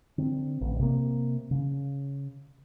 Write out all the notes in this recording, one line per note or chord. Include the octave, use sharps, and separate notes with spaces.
D3 C4
A1
C3 A#3
C#3